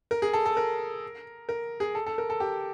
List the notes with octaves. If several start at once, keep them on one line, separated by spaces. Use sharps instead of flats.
A#4
G#4
A4
A4
A#4
A#4
G#4
A4
A4
A#4
A4
G4